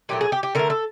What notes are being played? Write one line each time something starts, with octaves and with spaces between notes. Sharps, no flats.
A#2 F#3 A3 G4
G#4
G4
G4
D3 F#3 A3 A#4
A4